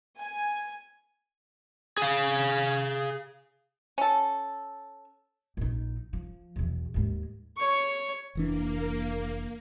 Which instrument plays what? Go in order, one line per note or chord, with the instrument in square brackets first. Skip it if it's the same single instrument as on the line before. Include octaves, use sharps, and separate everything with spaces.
[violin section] G#5
[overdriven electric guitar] G#4 F5
[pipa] C#4 A4
[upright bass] A#1 D#4
F3
B1 E2
D#2 G#2
[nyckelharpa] C#5 C#6
[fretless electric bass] F1 E3 D4 [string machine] A#3